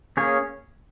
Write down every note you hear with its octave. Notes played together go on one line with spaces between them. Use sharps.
A#3 C#4 G#4 C#5